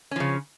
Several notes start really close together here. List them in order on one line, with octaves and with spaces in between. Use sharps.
C#4 F3 C#3